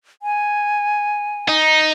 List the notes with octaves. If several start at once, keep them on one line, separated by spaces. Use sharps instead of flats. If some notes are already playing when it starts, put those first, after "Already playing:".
G#5
D#4